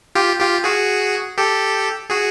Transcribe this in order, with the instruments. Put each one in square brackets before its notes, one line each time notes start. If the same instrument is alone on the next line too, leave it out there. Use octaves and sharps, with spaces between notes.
[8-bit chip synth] F4 G4
F4 G4
F#4 G#4
G4 A4
F#4 G#4